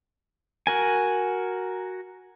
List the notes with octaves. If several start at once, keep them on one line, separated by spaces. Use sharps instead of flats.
F#4 A#4 G#5